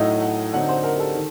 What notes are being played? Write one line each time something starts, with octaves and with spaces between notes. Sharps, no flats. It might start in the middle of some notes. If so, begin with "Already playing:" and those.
Already playing: A2 F#3 A3 D#4 D#5
F#5
D3 F#3 C4 D#4 F#5
C5
A#4
G4
A4
D#3